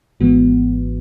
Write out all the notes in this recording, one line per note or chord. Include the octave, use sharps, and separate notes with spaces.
G#1 G#2 E3 B3 F#4